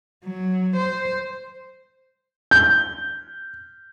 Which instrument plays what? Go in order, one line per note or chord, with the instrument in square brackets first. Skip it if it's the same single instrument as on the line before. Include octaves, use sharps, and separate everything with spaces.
[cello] F#3
C5
[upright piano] G6